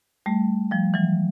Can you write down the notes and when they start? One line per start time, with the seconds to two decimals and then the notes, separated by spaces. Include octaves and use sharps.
0.26 G3 A3
0.71 F3 G3
0.94 E3 F#3